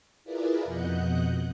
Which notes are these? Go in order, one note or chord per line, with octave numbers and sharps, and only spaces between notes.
E4 F4 G#4 A#4 B4 D5
F2 B2 D#5 F#5 F#6 G6